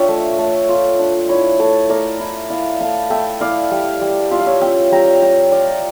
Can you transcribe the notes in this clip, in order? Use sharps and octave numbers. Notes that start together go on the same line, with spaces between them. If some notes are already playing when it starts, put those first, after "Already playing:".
Already playing: D4 F4 C#5 E5 G5 A5
A3
A3
F4
D4
E4 C#5 E5
A3 A4 C#5
A3 A#4 D5
E4
E4 D5 F5
A3 F5 A5
A3 E5 G5
E4 D5 F5
G3
G3
F4 E5
F5
C#5 E5
C#4 E5 G5
G3 G5 A#5
G3 E5 G5
F4 D5 F5